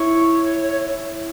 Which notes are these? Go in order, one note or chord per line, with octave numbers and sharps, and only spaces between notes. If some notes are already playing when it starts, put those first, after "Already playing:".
Already playing: E4 C#5